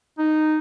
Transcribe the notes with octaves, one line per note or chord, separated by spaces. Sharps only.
D#4